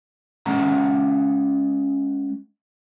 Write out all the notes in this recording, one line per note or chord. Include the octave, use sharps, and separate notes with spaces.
G#3 C#4 F#5 A#5